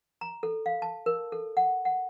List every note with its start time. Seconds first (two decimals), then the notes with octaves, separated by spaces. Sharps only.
0.21 A#5
0.43 A4
0.66 F5
0.82 A5
1.06 A#4
1.32 A4
1.57 F#5
1.85 F#5